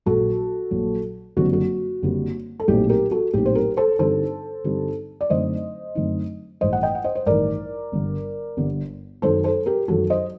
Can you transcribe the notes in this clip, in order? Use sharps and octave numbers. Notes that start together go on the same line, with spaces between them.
A#1 A#2 F#3 F#4 A4
A#1 A#2 F#3
F#1 F#2 D3 G3 C4 F#4
F#4
F#1 F#2 D3 G3 C4
A4
A#1 A2 F#3 C4 D#4 G4
G4 A#4
F#4 A4
A#1 A2 F#3 C4 D#4 G4
C5
G4 A#4
A4 C5
G2 D3 G3 C4 D#4 A4 C5
G2 D3 G3 C4 D#4
D5
F#2 D3 A3 C4 D#4 C5 D#5
F#2 D3 A3 C4 D#4
A1 G2 D#3 C5 D#5
F#5
D#5 G5
F#5
C5 D#5
C5
A1 G2 D#3 A#4 D5
G1 G2 D3
G1 G2 D3
F#2 D#3 F#3 A4 C5
A4 C5
G4 A#4
F#2 D#3 F#3 F#4 A4
C5 D#5